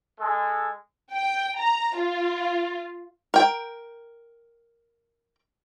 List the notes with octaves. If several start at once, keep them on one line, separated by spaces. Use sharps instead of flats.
G#3 A4
G5
A#5
F4
A#4 G5